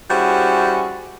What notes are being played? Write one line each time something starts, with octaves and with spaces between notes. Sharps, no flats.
G3 C#4 E4 F#4 G#4 C5